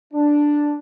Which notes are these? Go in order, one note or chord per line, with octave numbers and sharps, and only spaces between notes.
D4